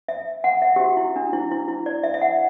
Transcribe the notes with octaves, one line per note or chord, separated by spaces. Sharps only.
E5
F#5
E5
G4
F#4
E4
D4
E4
E4
E4
D5
E5
E5
F#5